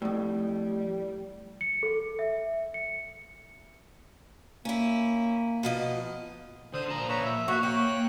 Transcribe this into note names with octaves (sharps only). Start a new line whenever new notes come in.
F2 A2 G3
C#7
A4
E5
C#7
A#3 C#4 E4
B2 F3 D#5
D3 C5 D#6
A#2 F3 A5 A#5
B4 C#5 A#5
E5
A#3 F#4
C#4 G5 F#6